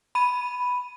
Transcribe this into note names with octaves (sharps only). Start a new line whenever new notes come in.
B5 D#7